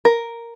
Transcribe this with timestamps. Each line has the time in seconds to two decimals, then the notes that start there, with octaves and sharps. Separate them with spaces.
0.05 A#4